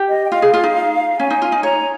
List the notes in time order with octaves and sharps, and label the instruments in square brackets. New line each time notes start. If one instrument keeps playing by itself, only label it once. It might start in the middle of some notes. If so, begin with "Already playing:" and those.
Already playing: [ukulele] G4
[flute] D#5
G5
[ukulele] F4 [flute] F5
[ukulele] G#4
F4
D#4
[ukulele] C#4 [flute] G#5
[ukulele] D#4
F4
D#4
[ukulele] C#5 [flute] A#5